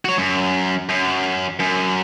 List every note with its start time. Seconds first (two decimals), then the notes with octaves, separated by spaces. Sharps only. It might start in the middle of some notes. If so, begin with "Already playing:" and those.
0.05 F#4 C#5
0.18 F#2
0.89 F#2
1.59 F#2